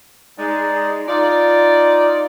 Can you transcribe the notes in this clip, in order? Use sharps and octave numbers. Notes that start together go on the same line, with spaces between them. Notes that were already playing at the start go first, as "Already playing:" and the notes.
G#3 D#4 D5
D#4 F4 D5